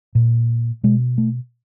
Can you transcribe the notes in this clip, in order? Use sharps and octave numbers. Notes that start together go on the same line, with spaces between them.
A#2
B2 G#3
A3